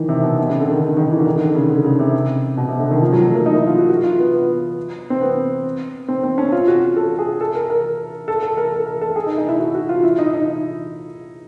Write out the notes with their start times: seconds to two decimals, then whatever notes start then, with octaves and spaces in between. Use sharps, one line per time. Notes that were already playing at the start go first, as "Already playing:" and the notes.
Already playing: D#3 E3
0.09 C3
0.23 B2
0.38 C3
0.49 C#3
0.60 D3
0.71 D#3
0.82 D3
0.97 D#3
1.11 E3
1.20 D3
1.26 D#3
1.36 D#3
1.41 D3
1.55 C#3
1.70 D3
1.84 C#3
1.99 C3
2.57 B2
2.68 C3
2.79 D3
2.91 D#3
3.02 F3
3.13 F#3
3.23 A3
3.35 A#3
3.46 D#4
3.56 E4
3.67 F4
3.78 F#4
3.89 F#4
4.03 F4
4.19 B3
4.33 B3
5.10 C4
5.21 B3
6.08 C4
6.23 C4
6.38 C#4
6.52 F4
6.68 F#4
6.96 A4
7.18 G#4
7.41 A4
7.55 A#4
7.70 A#4
8.28 A4
8.43 A4
8.57 A#4
8.72 A4
8.86 A#4
9.01 A4
9.16 G#4
9.26 D#4
9.38 D#4
9.49 E4
9.60 F#4
9.74 F#4
9.89 F4
10.04 E4
10.18 D#4
10.33 D#4